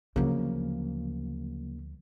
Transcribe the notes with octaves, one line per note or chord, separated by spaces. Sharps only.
D2 C#3 F3 F#3 A#3